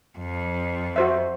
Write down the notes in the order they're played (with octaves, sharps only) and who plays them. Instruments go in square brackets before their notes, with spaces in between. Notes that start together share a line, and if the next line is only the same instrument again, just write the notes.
[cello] F2
[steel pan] F#4 C5 E5